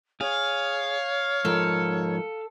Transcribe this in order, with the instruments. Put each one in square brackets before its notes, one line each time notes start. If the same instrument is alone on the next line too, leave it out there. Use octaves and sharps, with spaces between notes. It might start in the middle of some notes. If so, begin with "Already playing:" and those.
[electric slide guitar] G#4 [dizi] C#5 [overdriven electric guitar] F5
[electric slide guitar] G#2 F3 A#4 [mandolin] A4